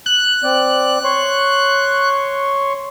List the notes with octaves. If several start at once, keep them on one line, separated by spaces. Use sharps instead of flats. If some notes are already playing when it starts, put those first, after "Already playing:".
F#6
C4 D5
C#5 C6 C#6